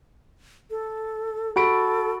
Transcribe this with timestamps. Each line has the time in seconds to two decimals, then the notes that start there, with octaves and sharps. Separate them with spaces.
0.70 A4
1.56 F#4 A4 B5 D7